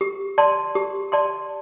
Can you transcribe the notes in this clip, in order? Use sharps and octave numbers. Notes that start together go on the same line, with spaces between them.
G4
D5 A5 C6
G4
D5 A5 C6